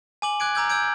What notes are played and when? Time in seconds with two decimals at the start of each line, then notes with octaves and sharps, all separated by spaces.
0.22 G#5 D6 F#7
0.40 D6 F#6 G#6 D7
0.55 A#5 D6 E6 G6 G#6
0.70 E6 G6 G#6 D7